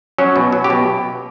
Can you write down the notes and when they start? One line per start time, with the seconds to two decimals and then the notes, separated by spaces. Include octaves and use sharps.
0.18 F#3 C#4
0.36 B2
0.53 F#3
0.64 G4
0.70 B2